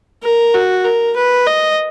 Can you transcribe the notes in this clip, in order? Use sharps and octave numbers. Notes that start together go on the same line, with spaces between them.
A#4
F#4
A#4
B4
D#5